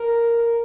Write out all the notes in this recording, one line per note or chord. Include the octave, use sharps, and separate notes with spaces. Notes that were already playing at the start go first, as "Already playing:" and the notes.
Already playing: A#4